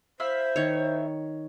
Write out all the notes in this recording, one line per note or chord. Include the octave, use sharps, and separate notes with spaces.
E4 C5 E5 F5
D#3 C#5